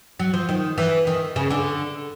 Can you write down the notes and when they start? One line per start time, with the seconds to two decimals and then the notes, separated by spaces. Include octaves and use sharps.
0.20 F#3
0.34 F3
0.49 D#3
0.78 E3
1.07 D#3
1.36 C#3
1.50 D3